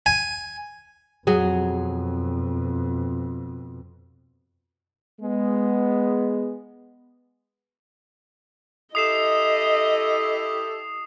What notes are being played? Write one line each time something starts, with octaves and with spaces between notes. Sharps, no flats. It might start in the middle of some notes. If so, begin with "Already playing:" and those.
G#5
F2 B2 F#3 G#4
G#3 B3
E4 G4 A4 D#5 D#6 C7 E7